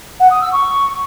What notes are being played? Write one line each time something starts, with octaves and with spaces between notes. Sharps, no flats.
F#5
D#6
E6
C#6